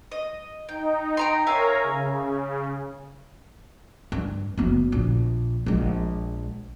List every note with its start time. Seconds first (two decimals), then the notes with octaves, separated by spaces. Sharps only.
0.12 D#5
0.69 D#4 G5
1.17 G5 A#5 C6
1.47 A#4 C#5 E5 F5 G#5 A#5
1.83 C#3
4.12 G2
4.57 F#1 B3
4.92 A#1
5.66 A#1 G#3